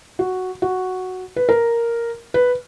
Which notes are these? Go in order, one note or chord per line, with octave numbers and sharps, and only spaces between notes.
F#4
F#4
B4
A#4
B4